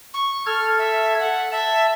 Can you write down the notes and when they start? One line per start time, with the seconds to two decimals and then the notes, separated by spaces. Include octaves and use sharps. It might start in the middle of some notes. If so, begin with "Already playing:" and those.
0.14 C#6
0.46 A4 F6 G#6
0.79 E5
1.20 F#5
1.52 E5 A5